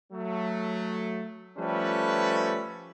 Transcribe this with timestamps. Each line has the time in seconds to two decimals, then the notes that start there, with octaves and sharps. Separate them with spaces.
0.13 F#3 A3
1.58 F3 G3 A3 C#4 A4 B4